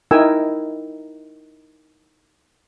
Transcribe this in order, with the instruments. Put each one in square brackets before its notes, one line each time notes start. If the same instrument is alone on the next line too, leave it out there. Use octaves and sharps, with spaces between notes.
[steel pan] D#4 E4 A#4 G5 G#5 E6